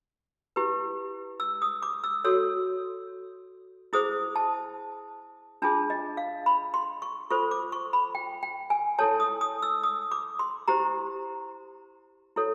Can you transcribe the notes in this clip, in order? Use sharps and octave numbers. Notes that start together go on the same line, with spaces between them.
E4 G4 B4
E6
D#6
D6
E6
F#4 A4 C#5 E6
E4 G#4 C5 D#6
A5
D4 F4 G#4 A5
D#5
F5
B5
C6
C#6
F4 A4 C5 C#6
D6
C#6
B5
G5
G5
G#5
E4 A4 C#5 A5
D#6
D#6
E6
D#6
D6
C6
E4 G4 C5 A#5
E4 A4 C#5